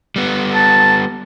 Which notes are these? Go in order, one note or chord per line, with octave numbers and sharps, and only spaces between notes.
G3 B3
A5